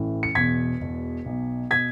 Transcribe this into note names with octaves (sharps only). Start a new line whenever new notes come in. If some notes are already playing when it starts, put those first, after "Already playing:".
Already playing: A1 A2 E3
C#7
E1 E2 B2 G#6 B6
E1 E2 B2
B1 B2
B2 G#6 B6